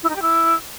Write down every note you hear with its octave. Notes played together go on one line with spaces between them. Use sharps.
E4
D#4
G4
E4